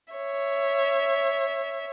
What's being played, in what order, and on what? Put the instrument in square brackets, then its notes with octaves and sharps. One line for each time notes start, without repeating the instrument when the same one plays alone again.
[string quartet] C#5 E5